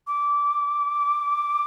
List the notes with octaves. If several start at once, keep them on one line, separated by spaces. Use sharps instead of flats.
D6